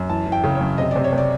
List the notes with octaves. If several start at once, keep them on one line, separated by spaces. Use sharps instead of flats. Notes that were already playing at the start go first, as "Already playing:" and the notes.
Already playing: F#2
E3 A5
E3
G5
C#3
C#5
F#2
C3 D#5
C3 D5
C#5
C3
D5